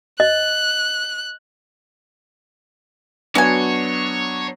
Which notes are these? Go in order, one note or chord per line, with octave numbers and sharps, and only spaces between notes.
D#5 F#6
F#3 B3 D4 F#4 C#5 G#5